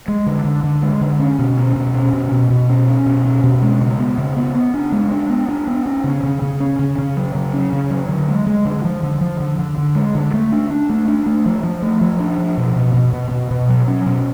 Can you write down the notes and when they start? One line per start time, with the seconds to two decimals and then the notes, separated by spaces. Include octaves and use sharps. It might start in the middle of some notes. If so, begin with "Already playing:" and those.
0.08 G#3
0.26 D3
0.45 D3
0.64 D3
0.82 G#3
1.01 D3
1.20 C#4
1.39 B2
1.57 C#4
1.76 B2
1.94 C#4
2.13 B2
2.32 B2
2.50 B2
2.70 C#4
2.88 C#4
3.06 B2
3.25 C#4
3.44 B2
3.62 G#3
3.81 C#3
3.99 B3
4.18 C#3
4.37 B3
4.55 B3
4.74 D4
4.92 G#3
5.11 D4
5.30 B3
5.49 D4
5.67 B3
5.86 C#4
6.04 C#3
6.23 C#3
6.42 C#3
6.60 C#4
6.79 C#3
6.98 C#3
7.17 F#3
7.35 C#3
7.53 C#4
7.73 C#3
7.90 F#3
8.09 D3
8.28 G#3
8.47 G#3
8.65 D3
8.84 F3
9.03 D3
9.21 F3
9.40 D3
9.59 D3
9.78 D3
9.95 G#3
10.15 D3
10.34 A3
10.52 D4
10.70 D4
10.89 A3
11.08 D4
11.26 A3
11.46 F3
11.63 F3
11.82 A3
12.01 F3
12.20 D4
12.38 F3
12.58 B2
12.76 B2
12.94 B2
13.13 B2
13.31 B2
13.51 B2
13.69 F#3
13.88 C#4
14.06 B2